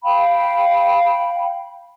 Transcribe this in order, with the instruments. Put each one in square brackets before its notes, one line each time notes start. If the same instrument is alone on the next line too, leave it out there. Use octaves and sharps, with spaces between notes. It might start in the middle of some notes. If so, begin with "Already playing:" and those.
[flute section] F5 G5 B5